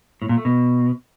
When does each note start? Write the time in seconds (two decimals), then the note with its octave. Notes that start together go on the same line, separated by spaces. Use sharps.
0.22 A2
0.29 A#2
0.37 A3
0.45 B2